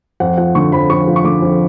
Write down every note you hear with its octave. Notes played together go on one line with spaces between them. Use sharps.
F2 F#5
F3 F#5
D3 C#6
F2 B5
F2 C#6
F3
C#6
D3 D6
F2